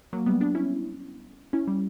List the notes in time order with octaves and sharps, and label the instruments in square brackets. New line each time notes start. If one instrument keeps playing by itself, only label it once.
[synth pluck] F#3 A#3
G3 B3
B3 D4
C#4 E4
C#4 E4
G3